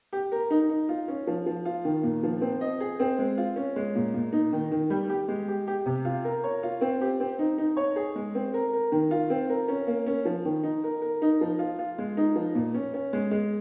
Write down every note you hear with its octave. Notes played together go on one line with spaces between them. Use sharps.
G4
A#4
D#4
D#4
F4
C#4
F3
F3
F4
D#3
A#2
F3
C4
D#5
G#4
C4
G#3
F4
C#4
G#3
A#2
A#2
D#4
D#3
D#3
G3
G4
G#3
G4
G4
C3
F4
A#4
C#5
F4
C4
G4
C4
D#4
D#4
C#5
G#4
G#3
C4
A#4
A#4
D#3
F4
C4
A#4
C#4
A#3
C#4
F3
D#3
D#4
A#4
A#4
D#4
F3
F4
F4
G#3
D#4
F3
A#2
C#4
C#4
G#3
G#3